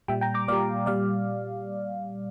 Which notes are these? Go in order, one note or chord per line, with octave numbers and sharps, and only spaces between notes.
A#2 G3 E5 G5
G5 A#5
A#5 D6
A#2 G3 D5 F5
A#2 G3 D5 F5